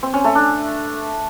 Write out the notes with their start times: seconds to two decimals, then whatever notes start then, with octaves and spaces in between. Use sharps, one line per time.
0.03 C4
0.14 C#4
0.24 A3
0.35 D4